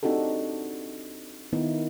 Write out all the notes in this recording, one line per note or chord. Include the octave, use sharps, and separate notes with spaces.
C4 D4 D#4 F#4 G4 A4
D#3 A#3 B3 D#4 E4